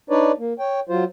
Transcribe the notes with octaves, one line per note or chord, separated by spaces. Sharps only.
D4 D#4 B4 C#5 D5
A#3
C#5 G5
F#3 F4 C5